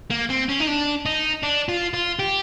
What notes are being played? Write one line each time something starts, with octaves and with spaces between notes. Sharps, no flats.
A#3
C4
C#4
D#4
D4
D#4
D4
F4
F4
G4